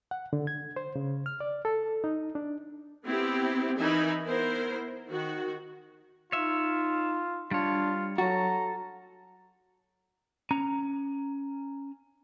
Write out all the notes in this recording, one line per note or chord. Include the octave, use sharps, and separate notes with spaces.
F#5
D3
G#6
C5
C#3
F6
D5
A4
D#4
D4
B3 C4 E4 G4
E3 D#4 A#4 E5 G#5 B5
B3 E4 A#4 C5
D#3 F#4
D#4 F4 C#5 E5
G3 D4 F4 C#5
F#3 F#4 A4 A#5
C#4 A#5